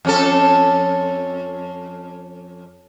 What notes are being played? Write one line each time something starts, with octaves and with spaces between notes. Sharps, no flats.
F2 C#4 A4